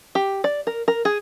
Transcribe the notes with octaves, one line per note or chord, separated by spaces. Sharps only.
G4
D5
A#4
A#4
G#4